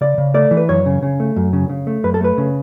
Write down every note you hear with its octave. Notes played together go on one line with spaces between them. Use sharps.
C#3 D5
C#3
A3 D5
E3
B4
F#2 C#5
C#3
C#3
A3
F#2
C#3
C#3
A3
F#2 B4
A4
A3 B4
C#3